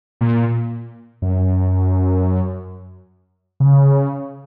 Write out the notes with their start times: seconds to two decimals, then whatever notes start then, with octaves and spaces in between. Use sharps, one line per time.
0.21 A#2
1.22 F#2
3.60 C#3